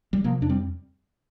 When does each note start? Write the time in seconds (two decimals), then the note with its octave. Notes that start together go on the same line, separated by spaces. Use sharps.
0.13 G3
0.24 C3 F3 A#3
0.41 F2 D4
0.49 G3 C4